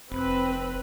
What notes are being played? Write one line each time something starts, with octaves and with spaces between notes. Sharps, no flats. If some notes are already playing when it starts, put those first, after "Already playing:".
F1 C4 B4